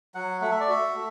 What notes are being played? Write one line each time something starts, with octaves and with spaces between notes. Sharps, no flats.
F#3 F#5
A3 F#5
E5
D5
F#4 E5
A3